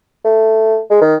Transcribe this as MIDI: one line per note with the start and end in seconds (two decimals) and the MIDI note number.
0.24 0.79 57
0.90 1.00 56
1.01 1.16 51